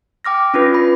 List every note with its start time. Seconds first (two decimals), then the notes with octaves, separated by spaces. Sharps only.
0.25 G5 D6 F6 A#6
0.54 C#4 D4 F4 B4
0.74 B5